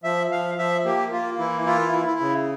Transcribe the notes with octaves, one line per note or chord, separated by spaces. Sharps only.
F3 E5
F3 F5
F3 E5
A#3 G4
A#3 F4
E3 E4
E4 F4
E4
E4
C#3